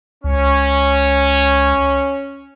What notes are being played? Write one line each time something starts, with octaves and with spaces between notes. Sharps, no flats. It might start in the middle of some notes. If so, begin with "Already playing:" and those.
C#2 C#4